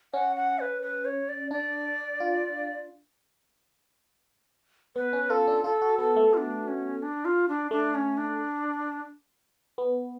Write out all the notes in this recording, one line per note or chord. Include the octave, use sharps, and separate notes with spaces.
C#4 F#5
F#5
B4
B4
C#5
D5
D4 D5
F4
B3 B4
C#4
F4 A4
D4
F4 A4
F#4
B3 A4
A3
F4
D4
C#4
D4
F4
D4
A3 D4
C#4
D4
B3